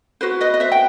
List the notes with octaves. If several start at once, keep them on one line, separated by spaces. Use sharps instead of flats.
F#4 B4 C5
B4 D#5
D#5
C5 E5
G5